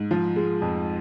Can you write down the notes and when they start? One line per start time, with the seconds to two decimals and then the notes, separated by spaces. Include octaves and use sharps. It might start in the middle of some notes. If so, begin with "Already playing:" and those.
Already playing: G#2
0.11 F3
0.36 G#3
0.62 F2